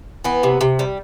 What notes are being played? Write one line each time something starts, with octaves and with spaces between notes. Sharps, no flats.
E3 B3
C3
C3
G3